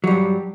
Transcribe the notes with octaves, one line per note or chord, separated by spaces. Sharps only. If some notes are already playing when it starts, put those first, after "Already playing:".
G2 F#3 G3